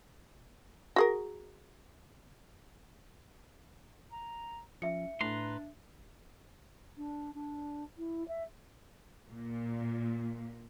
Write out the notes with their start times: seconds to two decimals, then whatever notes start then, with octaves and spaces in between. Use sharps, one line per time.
0.96 F#4 G#4 A#4
4.12 A#5
4.82 F3 C#4 E5 C#7
5.21 A2 D4 B4 A#5 C6
6.97 D4
7.34 D4
7.98 E4
8.28 E5
9.29 A#2